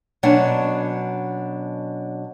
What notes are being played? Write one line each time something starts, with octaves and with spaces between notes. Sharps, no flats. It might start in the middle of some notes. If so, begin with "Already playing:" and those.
B2 F#3 C#4 D4 F#5